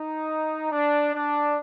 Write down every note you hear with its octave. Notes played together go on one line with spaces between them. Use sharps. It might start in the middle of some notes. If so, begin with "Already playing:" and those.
Already playing: D#4
D4
D4